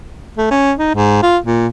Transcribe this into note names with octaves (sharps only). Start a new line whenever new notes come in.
A3
C#4
D#4
G#2
F4
A#2